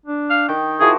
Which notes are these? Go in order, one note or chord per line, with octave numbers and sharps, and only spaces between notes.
D4
F5
D#3 G5
D#3 F3 E4 F#4 G#4